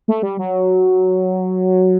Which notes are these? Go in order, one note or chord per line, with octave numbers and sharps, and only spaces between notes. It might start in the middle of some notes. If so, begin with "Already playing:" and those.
A3
G3
F#3